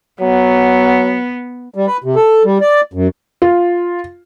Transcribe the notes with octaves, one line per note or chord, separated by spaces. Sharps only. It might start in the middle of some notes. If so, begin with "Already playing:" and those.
F#3 B3
G3
B4
C3
A4
G3
D5
F#2
F4